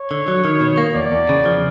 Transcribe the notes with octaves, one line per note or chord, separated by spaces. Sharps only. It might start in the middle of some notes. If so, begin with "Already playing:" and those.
Already playing: C#5
D3
F#3
D#3
B2
A#3
E2 D5
E2
C#3
F3